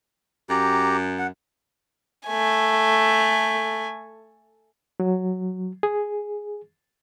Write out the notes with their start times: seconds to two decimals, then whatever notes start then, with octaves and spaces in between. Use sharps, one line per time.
0.50 F#2 G4 A#5
1.19 F#5
2.28 A3 G#5
5.00 F#3
5.83 G#4